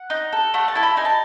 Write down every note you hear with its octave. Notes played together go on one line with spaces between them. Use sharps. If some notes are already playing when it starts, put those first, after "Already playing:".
Already playing: F#5
D#4
A4
A3 F#5
A5
E4 A4
B5
D#4 G#5
A5